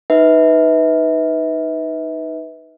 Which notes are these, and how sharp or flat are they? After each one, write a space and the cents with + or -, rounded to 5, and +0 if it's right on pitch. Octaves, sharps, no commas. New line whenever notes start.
D#4 +0 B4 +0 E5 -35